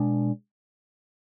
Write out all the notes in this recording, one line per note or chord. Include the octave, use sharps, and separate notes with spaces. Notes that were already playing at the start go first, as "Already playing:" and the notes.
Already playing: B2 G#3 D4